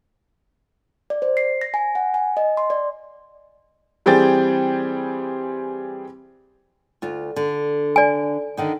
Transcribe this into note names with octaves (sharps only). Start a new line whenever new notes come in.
D5
C5
C7
A#6
G#5
F#5
G#5
D#5
C6
D5
E3 G3 C4 G#4 G5 A6
D2 F4
D3
D5 G#5
D3 D#3 D#4